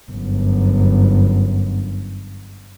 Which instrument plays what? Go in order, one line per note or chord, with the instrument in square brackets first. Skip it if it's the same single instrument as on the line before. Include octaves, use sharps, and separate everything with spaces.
[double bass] G1 F#2